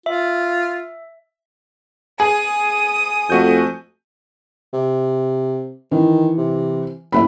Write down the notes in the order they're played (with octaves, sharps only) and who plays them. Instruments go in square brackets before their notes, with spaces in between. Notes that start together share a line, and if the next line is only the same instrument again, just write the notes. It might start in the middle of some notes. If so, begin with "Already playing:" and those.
[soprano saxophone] F4 [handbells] E5
[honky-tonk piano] G#4 [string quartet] D#6
[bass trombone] F2 [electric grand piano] A3 F#4 G6
[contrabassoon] C3
[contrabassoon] D#3 [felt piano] E3
[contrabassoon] C3
[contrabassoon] F#1 [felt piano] A2 E5 B5